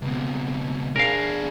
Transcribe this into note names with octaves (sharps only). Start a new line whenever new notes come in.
C#2 B2
D4 G#4 A#4 F5